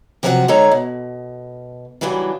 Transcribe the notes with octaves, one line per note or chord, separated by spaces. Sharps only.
C3 F3 F#3 F4 G#4 F#5
D3 G#3 D#4 A4 C#5 A#5
B2
C#3 E3 F#3 G3 D4